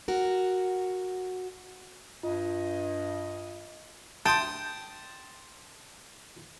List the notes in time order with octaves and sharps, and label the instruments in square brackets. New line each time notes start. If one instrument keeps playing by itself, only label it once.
[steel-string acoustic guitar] F#4 A#4
[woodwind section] G2 D#5 [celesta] F4
[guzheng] G5 [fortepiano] A5 [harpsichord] C6 D#6